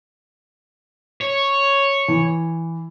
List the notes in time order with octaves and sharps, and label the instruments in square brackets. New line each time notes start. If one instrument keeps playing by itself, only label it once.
[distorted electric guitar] C#5
[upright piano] E3